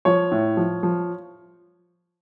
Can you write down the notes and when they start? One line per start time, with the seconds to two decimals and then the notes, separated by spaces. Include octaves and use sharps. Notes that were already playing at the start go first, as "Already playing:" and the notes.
0.05 F3 C#5
0.32 A2
0.57 F3
0.83 F3